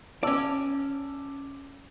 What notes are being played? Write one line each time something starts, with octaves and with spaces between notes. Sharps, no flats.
C#4 D5 A5 D6 E6